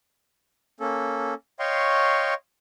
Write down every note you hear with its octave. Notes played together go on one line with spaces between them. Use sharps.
A#3 C#4 A4
C#5 D#5 F5 G5 C6 C#6